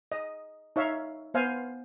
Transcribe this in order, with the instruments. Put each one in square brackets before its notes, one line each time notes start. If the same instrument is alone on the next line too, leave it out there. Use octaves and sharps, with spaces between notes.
[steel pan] D#5
D#4 C#5 E5 F5
B3 C5 F5 G#5